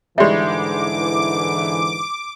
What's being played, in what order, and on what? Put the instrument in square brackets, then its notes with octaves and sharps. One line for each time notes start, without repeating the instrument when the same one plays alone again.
[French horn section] G#2 D3 E3 [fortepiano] G3 G#3 [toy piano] G4 E5 [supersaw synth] D6